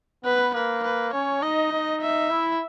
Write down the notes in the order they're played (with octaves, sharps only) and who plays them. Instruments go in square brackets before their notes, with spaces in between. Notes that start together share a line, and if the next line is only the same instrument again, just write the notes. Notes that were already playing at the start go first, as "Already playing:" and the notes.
[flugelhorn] B3 [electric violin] B4
[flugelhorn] A#3 [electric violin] B4
[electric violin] B4
[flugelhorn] C#4 [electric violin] C#5
[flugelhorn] D#4 [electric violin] D#5
[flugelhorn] D#4
[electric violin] E5
[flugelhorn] E4